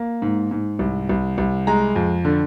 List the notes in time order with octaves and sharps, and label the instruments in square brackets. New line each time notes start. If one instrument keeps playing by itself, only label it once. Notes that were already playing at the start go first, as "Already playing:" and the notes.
Already playing: [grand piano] A#3
G#2
G#2
C2
C2
C2
G#3 A#5
F2
D3